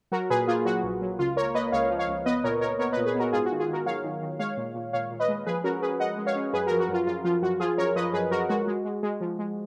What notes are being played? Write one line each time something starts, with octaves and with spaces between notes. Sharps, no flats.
F#3 F#4 A#4
A#2 G#4 B4
A#3 F4 G#4
F#3 F#4
A#1
F#3
C#2 F4
A#3 A#4 C#5
A#3 B4 D#5
C#2 C#5 F5
F3
C#5 F5
C#2
B3 B4 D#5
A#2 A#4 C#5
A#2 A#4 C#5
B3 A#4 C#5
A#2 B4 D#5
G#4 B4
B3 F#4 A#4
G#2 F4 G#4
F#4
D#3
F4 G#4
D#3 F#4 A#4
F#3 C#5 F5
D#3
D#3
G#3 C#5 F5
A#2
A#2
A#2 C#5 F5
A#2
B4 D#5
G#3
F3 G#4 B4
C#4 F#4 A#4
C#4 G#4 B4
G#3 D#5 F#5
G#3
C#5 F5
C#4
F#2 G#4 B4
F3 F#4 A#4
F#4
F#2 F4
F#2 F4
F3 F4
F#2 F#4
F3 F4 G#4
F#2 A#4 C#5
F3 B4 D#5
F#2 G#4 B4
F#2 F#4 A#4
G#3 F#4
G#3
G#3
G#3
F3
G#3